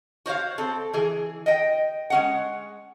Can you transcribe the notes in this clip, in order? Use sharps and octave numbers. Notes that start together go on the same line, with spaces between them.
F#4 C5 C#5 F5
C4 A4
E3 G#4
D#5 G5
G#3 C#4 F#5